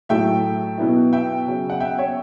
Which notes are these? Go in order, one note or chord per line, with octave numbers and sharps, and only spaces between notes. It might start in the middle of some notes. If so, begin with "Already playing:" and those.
A2 F#3 A3 E5 G5
B2 F#3 B3 E4
E5 G5
C#3 F#3 C#4
F#5
E5 G5
C#5 E5